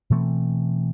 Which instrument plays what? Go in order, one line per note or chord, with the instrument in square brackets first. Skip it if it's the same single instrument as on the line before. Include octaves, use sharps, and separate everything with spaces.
[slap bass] B2 E3 A3 C4